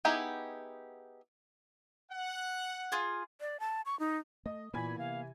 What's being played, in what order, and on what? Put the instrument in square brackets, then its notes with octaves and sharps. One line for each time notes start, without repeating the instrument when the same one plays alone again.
[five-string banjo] B3 D#4 E4 G4 G#4
[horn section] F#5
[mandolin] F4 G#4
[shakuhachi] D5
A5
C#6
D#4
[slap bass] A3 [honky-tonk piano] D#5
[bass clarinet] A#2 [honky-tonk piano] E3 G#5 G#6 [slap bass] A#3 B3 [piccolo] B5
[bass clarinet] C3 [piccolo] F5